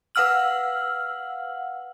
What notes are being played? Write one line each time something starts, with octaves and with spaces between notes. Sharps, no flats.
B4 F5 F#5 E6 F6 F#7